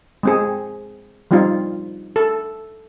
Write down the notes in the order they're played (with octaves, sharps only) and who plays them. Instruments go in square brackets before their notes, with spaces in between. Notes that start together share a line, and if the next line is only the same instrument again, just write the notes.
[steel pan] G#3 C4 G#4
F3 G3 C4 D#4 F4
A4